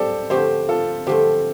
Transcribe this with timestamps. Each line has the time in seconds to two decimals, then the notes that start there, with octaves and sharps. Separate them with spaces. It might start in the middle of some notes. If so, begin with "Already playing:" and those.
Already playing: A2 A3 D4 G4 A4 C5 D5
0.30 D3 F3 A3 C4 G4 C5
0.69 F4 A4
1.07 D3 F3 A3 C4 G4 C5